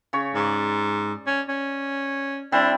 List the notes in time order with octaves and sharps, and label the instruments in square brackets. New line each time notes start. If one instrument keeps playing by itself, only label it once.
[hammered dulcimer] C#3 C#5 C#6
[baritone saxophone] G#2 [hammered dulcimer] D5
[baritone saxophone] C#4
C#4
[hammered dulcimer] G3 C4 E4 [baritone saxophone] D4